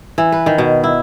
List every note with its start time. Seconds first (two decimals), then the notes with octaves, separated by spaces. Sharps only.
0.18 E3
0.32 B4
0.46 D#3
0.58 B2
0.84 E4